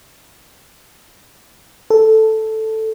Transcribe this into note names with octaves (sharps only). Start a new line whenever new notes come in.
A4